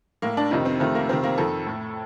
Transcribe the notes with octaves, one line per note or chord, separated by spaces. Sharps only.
A2 A#3
D4
F2 C3 D#3 D#4
C4
F2 C3 D#3 A3
A#3
F2 C3 D#3 C4
A#3
F2 D#3 A4
A2